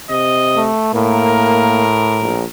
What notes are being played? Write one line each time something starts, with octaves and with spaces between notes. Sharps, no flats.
C3 D#5
A3
A2 A#3 A#4
A#1